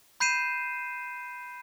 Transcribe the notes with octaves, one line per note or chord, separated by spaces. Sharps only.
B5 G6 C7 D#7 E7